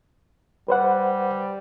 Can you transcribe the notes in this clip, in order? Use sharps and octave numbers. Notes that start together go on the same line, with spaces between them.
G3 B4 C5 F#5